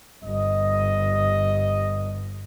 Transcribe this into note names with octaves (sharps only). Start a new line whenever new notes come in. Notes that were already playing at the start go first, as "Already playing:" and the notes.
G1 D#5